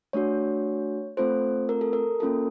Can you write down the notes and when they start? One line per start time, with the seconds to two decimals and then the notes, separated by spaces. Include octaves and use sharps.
0.13 A3 D4 F#4 C#5
1.17 A3 C4 F4 A4 C5
1.69 A#4
1.81 A4
1.93 A#4
2.20 A#3 C#4 F4 A4